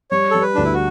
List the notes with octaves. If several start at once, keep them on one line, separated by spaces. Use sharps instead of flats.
G3 C#5
G3 A4
B4
D2 D4
E4
F#4